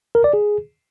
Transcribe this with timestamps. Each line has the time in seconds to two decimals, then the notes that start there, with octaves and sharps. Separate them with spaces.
0.15 A#4
0.24 D5
0.33 G#4